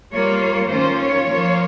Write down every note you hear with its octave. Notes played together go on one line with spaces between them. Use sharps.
G3 A#3 F4 C#5
C#5
D#3 A#3 C#4 F4 C5
C#5
F3 A#3 F4